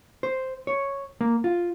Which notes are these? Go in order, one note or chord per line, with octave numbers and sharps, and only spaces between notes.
C5
C#5
A#3
F4